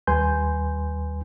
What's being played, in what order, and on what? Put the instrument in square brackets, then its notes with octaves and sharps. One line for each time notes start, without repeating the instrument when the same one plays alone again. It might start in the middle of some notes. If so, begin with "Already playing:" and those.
[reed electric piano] D#2 G3 B4 G#5 C6 G6